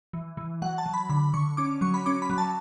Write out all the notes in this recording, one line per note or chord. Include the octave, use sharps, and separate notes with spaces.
E3
E3
F#3 F#5
A5
F#3
B5
D3 B5
D3 C#6
C#4 D6
F#3 C#6
B5
C#4 D6
B5
F#3
A5